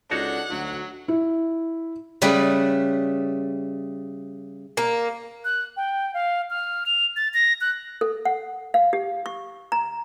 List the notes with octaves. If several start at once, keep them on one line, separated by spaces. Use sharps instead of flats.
C#2 D4 D#4 F#4 A4 C#5 F#5
D2 F#3
E4
C#3 G3 A3 B4
A#3
F#6
G5
F5
F6
F7
A6
A#6
F#6
A4
F#5
F5
G4
C#6
A#5